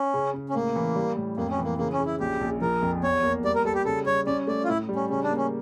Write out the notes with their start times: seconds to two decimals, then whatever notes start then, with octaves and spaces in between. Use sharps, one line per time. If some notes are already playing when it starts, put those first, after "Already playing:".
Already playing: C#4
0.14 C#3
0.34 C#3
0.49 C#4
0.54 A2 A#3
0.76 E3
0.96 G3
1.17 A2
1.37 F2 A#3
1.51 C#4
1.58 E3
1.64 A#3
1.78 C#3 A#3
1.93 C#4
1.99 C#3
2.06 E4
2.20 A#1 G4
2.41 A#1
2.61 F3 A#4
2.82 F2
3.03 E2 C#5
3.23 A#3
3.44 G3 D5
3.55 A#4
3.65 G3 A4
3.75 G4
3.85 C#3 A4
4.06 G3 C#5
4.27 C#4 D5
4.47 A3 D5
4.64 F4
4.68 A2 E4
4.89 G3
4.96 C#4
5.10 C#3 C#4
5.24 D4
5.30 A#3
5.37 C#4